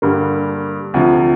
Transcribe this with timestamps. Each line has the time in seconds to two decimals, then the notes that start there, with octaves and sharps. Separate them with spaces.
0.02 G2 D3 G3 A#3
0.94 D2 C3 F3